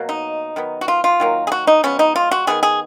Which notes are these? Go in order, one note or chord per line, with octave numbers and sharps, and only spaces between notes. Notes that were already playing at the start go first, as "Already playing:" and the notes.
Already playing: B2 F#3 A#3
D#4
D#3 F#3 B3
F#4
F4
F4
D#3 F#3 A#3
G#4
F#4
D#4
F3 G#3 B3 C#4
D#4
F4
F#4
D#3 F#3 B3 G#4
G#4